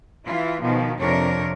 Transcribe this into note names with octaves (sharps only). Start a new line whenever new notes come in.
E3 E4 F4
B2 D#3 F3
F2 C3 D4 A#4 C#5